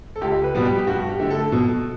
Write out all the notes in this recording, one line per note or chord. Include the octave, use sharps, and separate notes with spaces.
A4
C#2 G4
B4
B2 G3 B3
G4
G4
G2 F#4
G4
D3 A3
A4
B2